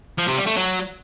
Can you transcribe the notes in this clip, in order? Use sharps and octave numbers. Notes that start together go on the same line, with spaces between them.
F3
C3
G3
A3
F#3